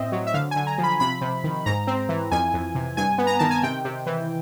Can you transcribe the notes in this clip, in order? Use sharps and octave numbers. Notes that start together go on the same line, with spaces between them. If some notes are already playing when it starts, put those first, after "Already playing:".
Already playing: A2 C4 D#5 E5
F#3
E5
D3 F5
G#5
D3
A#5
F3
B5
C3 B5
C3
D#3
G#2 A#5
C4
E3
F2 G#5
F2
C3
G2 G#5
B3
A#5
D#3 A5
G#5
C3 G5
C3
E3